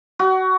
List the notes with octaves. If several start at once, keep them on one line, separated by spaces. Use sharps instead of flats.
F#4